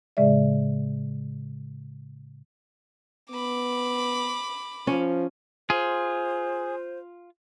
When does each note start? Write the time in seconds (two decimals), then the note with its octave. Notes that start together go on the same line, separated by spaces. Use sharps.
0.17 A2 C#3 G#3 G#4 D5 E5
3.31 B3 B5 D6
4.87 F3 C#4
5.70 F4 G#4 C5